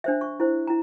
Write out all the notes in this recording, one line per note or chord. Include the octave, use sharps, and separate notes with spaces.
D4 C5 E5
C#6
E4 C5
E4 A#5